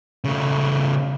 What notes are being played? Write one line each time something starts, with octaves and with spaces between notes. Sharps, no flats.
C#3 A3